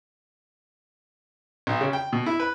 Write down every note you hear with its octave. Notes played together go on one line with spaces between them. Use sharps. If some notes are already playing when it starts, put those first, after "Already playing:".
B1
C#3
G5
B2
E4
B4